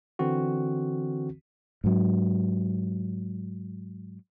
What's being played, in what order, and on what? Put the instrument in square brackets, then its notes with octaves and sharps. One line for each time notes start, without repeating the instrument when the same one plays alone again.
[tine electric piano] D3 E3 C4 F#4
[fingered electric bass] G#2 F#3